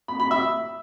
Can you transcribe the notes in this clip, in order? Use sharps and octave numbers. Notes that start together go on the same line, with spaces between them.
B5
B5
E5